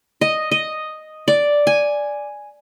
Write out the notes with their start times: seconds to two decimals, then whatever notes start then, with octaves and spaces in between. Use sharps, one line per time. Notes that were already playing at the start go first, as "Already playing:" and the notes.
0.21 D#5
0.51 D#5
1.28 D5
1.67 G#5